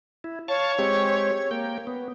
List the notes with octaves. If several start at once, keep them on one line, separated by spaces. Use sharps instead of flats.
E4
C#5 F5 A5 C#6
G#3 C4 G4
A#3 G5
B3